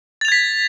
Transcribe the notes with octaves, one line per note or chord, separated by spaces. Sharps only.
G#6 A6 B6 F7